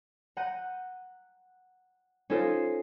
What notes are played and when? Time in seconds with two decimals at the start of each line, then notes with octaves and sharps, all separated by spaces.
0.37 F#5 A#5 G6 D#7
2.30 C#4 D#4 F4 A4 C5